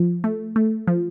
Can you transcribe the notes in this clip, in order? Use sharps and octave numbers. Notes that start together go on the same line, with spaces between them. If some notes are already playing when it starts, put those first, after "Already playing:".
Already playing: F3
A3
A3
F3